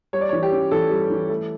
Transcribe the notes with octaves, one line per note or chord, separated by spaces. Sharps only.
G3 C#5
D5
C#5
E3
G4
C#4
E3 A4
G3
E3
A3